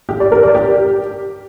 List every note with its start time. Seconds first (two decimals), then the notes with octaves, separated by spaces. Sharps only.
0.09 G4
0.20 D5
0.32 A#4
0.43 D5
0.55 G4